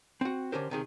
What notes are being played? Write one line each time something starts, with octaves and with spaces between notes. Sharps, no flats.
C4 F#4
D3 D#3 C#4 G4 A#4 C5
C#2 C3 D#3 G#4